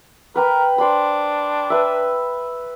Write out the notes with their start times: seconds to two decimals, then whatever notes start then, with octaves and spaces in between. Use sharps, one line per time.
0.36 A#4 B4 G5 B5
0.78 D4 C5 B5
1.70 B4 E5